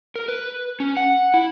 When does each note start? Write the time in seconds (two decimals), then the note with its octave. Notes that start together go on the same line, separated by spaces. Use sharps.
0.16 A#4
0.28 B4
0.80 C#4
0.97 F#5
1.34 E4